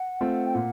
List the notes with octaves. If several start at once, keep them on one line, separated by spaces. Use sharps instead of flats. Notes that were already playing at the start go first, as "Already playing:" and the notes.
Already playing: F#5
A3 C4 F4
G5
A#2 F#5